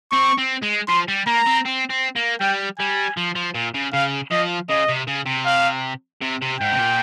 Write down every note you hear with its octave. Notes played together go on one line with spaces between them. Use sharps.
C4 C#6
C4
G#3
F3 C6
G3
A#3 A#5
C4
C4
C4
A#3
G3 G5
G3 G#5
F3
F3
A#2
C#3
C#3 F5
F3 D#5
C#3 D#5
C3
C#3
C3
F5
C3
C3
G#2 G5
C3
A#2